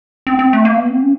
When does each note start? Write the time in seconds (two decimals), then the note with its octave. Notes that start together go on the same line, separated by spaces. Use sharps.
0.27 C4
0.39 C4
0.53 A3
0.65 A#3
0.77 B3
0.90 C4
1.02 C#4